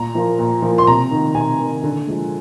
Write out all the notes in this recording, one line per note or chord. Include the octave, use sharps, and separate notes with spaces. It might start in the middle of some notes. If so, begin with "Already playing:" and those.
Already playing: A#2 A#5
F3 A#3
A#2
F3 A#3
C6
C3 A#5
D#3 A#3
C3 G#5
D#3 A#3
D3
F3 G#3